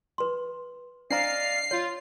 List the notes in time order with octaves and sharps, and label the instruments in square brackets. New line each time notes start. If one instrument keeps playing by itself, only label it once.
[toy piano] B4 C6
[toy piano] D4 C5 A#5 [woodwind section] D5 D#5 F5 [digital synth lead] C7
[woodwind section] F4 [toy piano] C#5